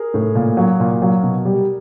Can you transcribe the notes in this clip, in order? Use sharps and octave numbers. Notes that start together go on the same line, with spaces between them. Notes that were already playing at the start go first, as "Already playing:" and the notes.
Already playing: G#4 A#4
A2
A#2
F#3
A#2
F#3
B2
G3